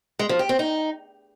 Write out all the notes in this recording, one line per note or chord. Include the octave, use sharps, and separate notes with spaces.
G#3
F3
G4
C4
D#4